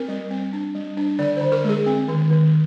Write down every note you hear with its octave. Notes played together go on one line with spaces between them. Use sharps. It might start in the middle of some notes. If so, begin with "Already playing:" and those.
Already playing: C4 A#4
G3
C4
D4
G3
D4
D3 D5
D3 C5
A#4
G#3 G#4
C4
D#3
D#3